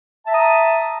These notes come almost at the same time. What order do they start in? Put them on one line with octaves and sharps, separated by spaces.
A5 E5 A#5 D#6